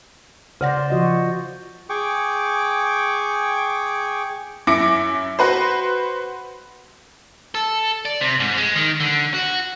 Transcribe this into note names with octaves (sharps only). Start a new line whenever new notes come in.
C#3 C5 D5 F#5 A#6
F3 F#4 D#5
G#4 G5 C#6 D6
F#2 E4 D6 A#6 C#7 D7
F#4 B4 C5
A4
D5
C3
G#2
G#3
D#3
D3
F#4